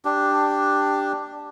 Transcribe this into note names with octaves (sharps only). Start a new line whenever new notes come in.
D4 G4